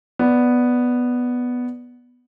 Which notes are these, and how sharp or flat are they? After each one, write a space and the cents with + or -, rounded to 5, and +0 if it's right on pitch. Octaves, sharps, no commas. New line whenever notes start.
B3 +0 D5 +0